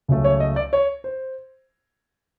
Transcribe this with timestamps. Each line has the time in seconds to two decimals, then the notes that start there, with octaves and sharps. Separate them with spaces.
0.08 C#2 C#3 F#3 A3
0.24 C#5
0.40 D#5
0.56 D5
0.73 C#5
1.04 C5